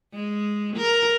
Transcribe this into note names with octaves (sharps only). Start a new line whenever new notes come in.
G#3
A#4